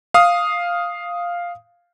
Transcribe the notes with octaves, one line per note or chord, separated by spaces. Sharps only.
F5 D#6